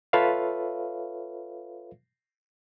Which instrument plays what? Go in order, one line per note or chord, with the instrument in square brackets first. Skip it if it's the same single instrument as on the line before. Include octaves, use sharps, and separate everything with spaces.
[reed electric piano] F4 A4 B4 C#5 E5 F5